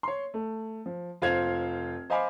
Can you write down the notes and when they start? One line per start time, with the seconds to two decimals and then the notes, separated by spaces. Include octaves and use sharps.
0.03 C#5 C6
0.34 A3
0.86 F3
1.22 F1 F4 C5 G#6 F7
2.10 C5 D#5 F5 G#5 B5 D6